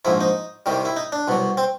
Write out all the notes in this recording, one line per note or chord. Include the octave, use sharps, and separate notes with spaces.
A#1 G#2 F3 E4
D#4
C2 C3 D#3 G3
E4
D#4
D4
C2 B2 F#3
C4